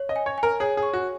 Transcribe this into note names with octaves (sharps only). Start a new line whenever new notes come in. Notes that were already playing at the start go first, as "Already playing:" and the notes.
Already playing: C#5
D#5
G#5
C#5
G#5
A#4
G#4 C#5
G#4
C#6
F#4